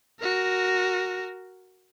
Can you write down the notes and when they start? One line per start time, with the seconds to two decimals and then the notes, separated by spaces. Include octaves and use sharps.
0.20 F#4 A#4